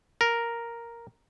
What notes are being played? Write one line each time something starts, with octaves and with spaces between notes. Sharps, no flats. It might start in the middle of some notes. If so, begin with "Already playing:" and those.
A#4